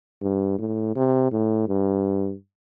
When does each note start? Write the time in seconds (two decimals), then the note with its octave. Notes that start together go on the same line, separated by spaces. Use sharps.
0.22 G2
0.59 A2
0.96 C3
1.32 A2
1.68 G2